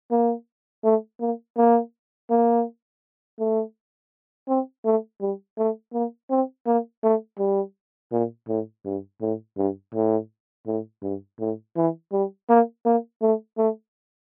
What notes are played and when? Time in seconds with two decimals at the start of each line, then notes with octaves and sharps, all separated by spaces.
0.11 A#3
0.84 A3
1.20 A#3
1.57 A#3
2.30 A#3
3.39 A3
4.48 C4
4.85 A3
5.21 G3
5.58 A3
5.93 A#3
6.30 C4
6.66 A#3
7.04 A3
7.39 G3
8.12 A#2
8.48 A2
8.85 G2
9.21 A2
9.57 G2
9.95 A2
10.67 A2
11.03 G2
11.40 A2
11.77 E3
12.12 G3
12.49 A#3
12.85 A#3
13.22 A3
13.58 A3